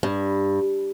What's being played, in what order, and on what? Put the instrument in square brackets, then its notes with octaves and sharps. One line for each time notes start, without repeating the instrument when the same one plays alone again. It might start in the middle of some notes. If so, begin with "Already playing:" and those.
[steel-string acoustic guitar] G2